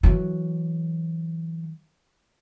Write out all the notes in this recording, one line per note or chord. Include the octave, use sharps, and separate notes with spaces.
E3 F#3